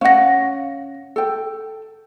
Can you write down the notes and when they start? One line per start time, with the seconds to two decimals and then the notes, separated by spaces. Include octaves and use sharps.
0.01 C#4 F5 F#5 A#6
1.16 A4 G5